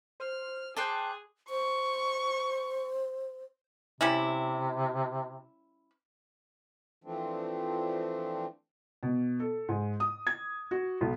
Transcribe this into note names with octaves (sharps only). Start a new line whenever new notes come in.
C5 F6
G#4 C5 G5 A5 D6 F#6 G6
C5 C#6
C3 G3 C#4 E4
E3 F3 A3 C4 D4
B2
A4
G#2
D#6
G#6
F#4
B1